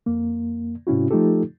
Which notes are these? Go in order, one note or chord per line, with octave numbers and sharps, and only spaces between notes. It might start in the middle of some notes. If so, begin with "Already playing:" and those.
F2 A#3
G#2 C3 C#4 E4 F#4
F3 A3 D#4 F4 G4 A4